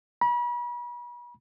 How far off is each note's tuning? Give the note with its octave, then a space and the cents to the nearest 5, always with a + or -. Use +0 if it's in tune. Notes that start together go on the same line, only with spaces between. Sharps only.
B5 -40